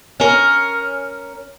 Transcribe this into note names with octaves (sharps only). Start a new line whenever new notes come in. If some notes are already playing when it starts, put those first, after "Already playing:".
C#4 A#4